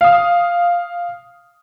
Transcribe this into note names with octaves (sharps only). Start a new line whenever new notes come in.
F5 D#6